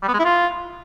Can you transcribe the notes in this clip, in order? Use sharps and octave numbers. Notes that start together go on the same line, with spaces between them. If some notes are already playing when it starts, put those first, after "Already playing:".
G3
B3
G#3
E4
F4